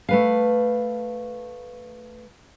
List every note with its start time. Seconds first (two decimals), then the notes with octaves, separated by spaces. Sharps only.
0.09 A3 B4 F5